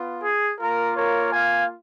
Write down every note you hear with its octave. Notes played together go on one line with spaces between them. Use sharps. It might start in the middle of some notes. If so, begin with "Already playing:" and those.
Already playing: B3 F4
G#4
A#3 F4 A#4
A#4 C#5
F5 G#5